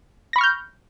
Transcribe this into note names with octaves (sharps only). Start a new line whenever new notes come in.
B5 C#6 F6 G6 A#6